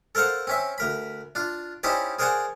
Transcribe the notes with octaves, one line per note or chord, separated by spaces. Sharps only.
A4 A#4 C5 F5 F#5
C4 C#4 E5
D2 A#4 B5
D4 F4
C#4 D#4 E4 G4 C5 D5
G#4 A#4 C5 D5 F#5 G#5